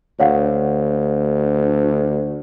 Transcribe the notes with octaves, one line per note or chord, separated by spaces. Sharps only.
D2 C#5 F5 F#5